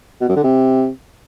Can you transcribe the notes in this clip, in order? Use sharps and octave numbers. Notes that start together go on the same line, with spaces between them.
B2
F#2
D3
C3